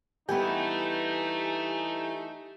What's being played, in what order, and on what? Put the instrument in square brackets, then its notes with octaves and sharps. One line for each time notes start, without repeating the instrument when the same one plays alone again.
[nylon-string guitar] E3 G3 B3 [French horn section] A3 D#4 [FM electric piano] G4 G#5 G6